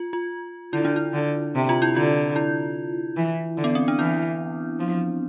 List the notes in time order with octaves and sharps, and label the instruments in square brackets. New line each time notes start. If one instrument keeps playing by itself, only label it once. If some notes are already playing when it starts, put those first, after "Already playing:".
Already playing: [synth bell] F4
F4
[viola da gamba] D3 [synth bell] E4
[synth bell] D4
E4
[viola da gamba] D3
C3
[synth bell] F4
E4
[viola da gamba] D3 [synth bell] F4
[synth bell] E4
[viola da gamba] E3
D3
[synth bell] B3
C4
D4
[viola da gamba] E3 [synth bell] E4
[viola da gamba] F3